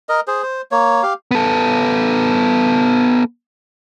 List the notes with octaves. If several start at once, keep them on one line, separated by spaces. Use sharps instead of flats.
A#4 D#5
G#4 C5
C5
A#3 C#5
G4 F5
B3 A4